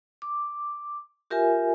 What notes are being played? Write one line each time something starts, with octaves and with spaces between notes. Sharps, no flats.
D6
F4 G4 A#4 E5 G#5